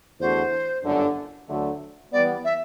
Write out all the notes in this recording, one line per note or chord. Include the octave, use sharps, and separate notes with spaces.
E2 D3 A3 D4 F#4 C5
G1 F#2 D3
D2 D3 F#3 A3
E3 G3 B3 D5
E5